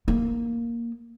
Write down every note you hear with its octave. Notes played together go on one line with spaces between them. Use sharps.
A#3